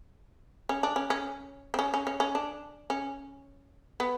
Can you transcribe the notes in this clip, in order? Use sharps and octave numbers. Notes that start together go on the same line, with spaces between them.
C#4
D4
C#4
C#4
C4
C#4
C#4
C#4
C#4
D4
C#4
B3